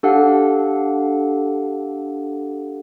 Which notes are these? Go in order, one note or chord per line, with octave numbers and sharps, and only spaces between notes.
D4 G4 A4 F5 F#5